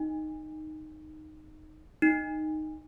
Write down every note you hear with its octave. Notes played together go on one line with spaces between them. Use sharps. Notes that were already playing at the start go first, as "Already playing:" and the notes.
Already playing: D#4
D#4